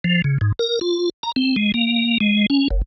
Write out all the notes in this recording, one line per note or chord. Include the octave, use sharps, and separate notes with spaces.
F3
C#3
G#2
A#4
F4
A#5
C4
G#3
A#3
G#3
C#4
F#1